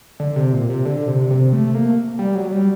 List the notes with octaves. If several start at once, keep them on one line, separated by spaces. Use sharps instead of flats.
D3
C3
A#2
C3
D3
C3
C3
A3
A#3
G3
F#3
G3